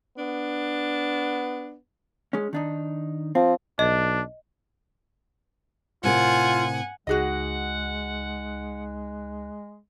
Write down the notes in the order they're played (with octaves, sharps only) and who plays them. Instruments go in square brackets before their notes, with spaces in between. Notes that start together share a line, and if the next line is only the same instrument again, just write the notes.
[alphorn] B3 [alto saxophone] D4
[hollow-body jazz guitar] G#3 C#4
D#3 D4 D#4
[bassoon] F3 [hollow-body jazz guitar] C4
[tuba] B1 [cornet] D4 [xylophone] D#5
[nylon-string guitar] A2 C3 A#4 [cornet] F4 [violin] F#5 G#5
[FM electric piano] C#2 D#4 F#6 [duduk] G#3 [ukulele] F#4 G#4 D#5 [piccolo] F#5